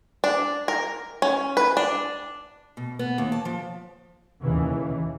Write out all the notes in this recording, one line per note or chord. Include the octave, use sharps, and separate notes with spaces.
D4
A#4
C#4
B4
D4
B2
B3
D#2
A5
F3
D#2 C#3 E3